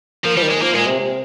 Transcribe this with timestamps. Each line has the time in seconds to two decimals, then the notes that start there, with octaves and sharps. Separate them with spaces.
0.25 F3 A#3
0.37 F3 G3
0.43 D#3
0.50 G#3
0.61 F3 A#3
0.75 A#2 G#3
0.86 C3
0.99 C3